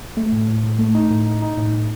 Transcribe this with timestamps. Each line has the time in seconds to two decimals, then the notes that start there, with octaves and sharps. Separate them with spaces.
0.17 A3
0.32 A2
0.48 A2
0.64 A2
0.79 A3
0.95 D#4
1.11 A2
1.26 D#4
1.42 D#4
1.57 A2
1.73 A2